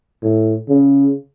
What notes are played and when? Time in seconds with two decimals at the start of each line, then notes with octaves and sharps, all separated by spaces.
0.22 A2
0.69 C#3